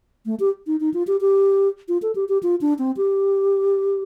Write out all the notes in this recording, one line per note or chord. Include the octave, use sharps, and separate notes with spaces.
A3
G4
D#4
D#4
F4
G4
G4
F4
A4
G4
G4
F4
D4
C4
G4